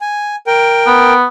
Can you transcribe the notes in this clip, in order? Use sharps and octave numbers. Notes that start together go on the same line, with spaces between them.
G#5
A#4 G5
B3